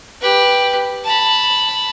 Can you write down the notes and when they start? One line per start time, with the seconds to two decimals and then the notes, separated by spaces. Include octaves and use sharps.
0.21 G4 B4
1.04 A5 B5